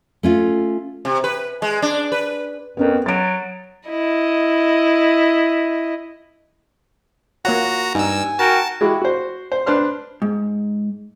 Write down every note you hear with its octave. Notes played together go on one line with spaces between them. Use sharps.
A3 C#4 F4
C3
B4
G#3
D4
B4
F2 B3 C#4 A#4
F#3 A6 D7
E4 D#5
A#3 F4 F#4 C#5 F#5 A#5 A#6
G2 D#4 G#5 E6
F#4 A#4 G5 A5
G#3 E4 F#4 G4
F#4 C5
C5
D4 B4 C5 C6 F6
G#2